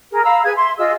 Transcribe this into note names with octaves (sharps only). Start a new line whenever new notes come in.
G#4 A#4
F5 A#5 B5 E6
G#4 B4 G#5 G#6
E5 C6
F4 G#4 D#5 E6